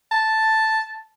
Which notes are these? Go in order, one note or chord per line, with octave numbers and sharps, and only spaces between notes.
A5